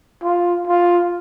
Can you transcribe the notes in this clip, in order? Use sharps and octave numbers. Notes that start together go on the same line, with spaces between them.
F4
F4